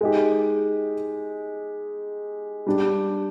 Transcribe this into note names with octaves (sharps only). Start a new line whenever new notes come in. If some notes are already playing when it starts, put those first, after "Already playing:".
G#3 D#4 G4
G3 D4 G4